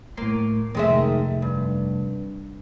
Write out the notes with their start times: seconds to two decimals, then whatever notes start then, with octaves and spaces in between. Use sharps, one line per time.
0.17 A2 A#3 C6
0.75 F2 C3 D#3 G#3 A3 E5
1.42 G2